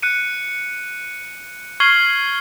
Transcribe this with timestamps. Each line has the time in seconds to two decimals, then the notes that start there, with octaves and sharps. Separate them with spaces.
0.03 F#6 C#7 D#7
1.80 C#6 F6 G#6 C7 F#7 G7